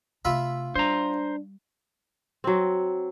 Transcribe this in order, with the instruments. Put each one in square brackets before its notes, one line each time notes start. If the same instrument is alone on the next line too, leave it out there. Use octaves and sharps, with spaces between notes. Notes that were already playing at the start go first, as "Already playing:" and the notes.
[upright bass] C3 A3 [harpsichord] F4 E5 B5
[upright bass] G3 [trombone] D4 [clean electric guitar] C5 A#5
[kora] F#3 C4